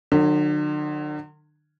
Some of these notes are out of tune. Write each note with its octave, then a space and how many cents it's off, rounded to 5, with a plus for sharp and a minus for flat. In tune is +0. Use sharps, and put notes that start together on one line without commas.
D3 +40 F#3 -25